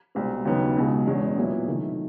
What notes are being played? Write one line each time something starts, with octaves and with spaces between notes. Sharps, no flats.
C2 B2 G#3 C4
D#2 C#3 F#3 B3 D#4
C#2 B2 G#3
E2 B2 G#3 C#4
A#2 F#3 B3 E4
C3 D#3 F#3 A3